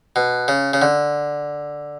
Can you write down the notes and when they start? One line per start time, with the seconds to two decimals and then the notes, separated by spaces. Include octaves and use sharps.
0.16 B2
0.48 C#3
0.73 C#3
0.82 D3